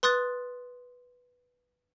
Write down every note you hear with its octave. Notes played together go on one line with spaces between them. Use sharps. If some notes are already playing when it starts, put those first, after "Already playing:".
B4 C6 D#6 F#6 A6